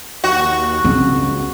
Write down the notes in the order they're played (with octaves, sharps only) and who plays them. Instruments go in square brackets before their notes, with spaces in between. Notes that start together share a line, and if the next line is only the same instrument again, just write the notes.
[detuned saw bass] D#2 [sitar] F#4
[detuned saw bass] C#2 [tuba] C#3 [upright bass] C4